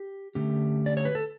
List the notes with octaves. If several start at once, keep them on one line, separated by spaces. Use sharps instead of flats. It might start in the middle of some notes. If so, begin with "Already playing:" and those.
Already playing: G4
D3 A3 C#4 G4
D5
C#5
B4
A4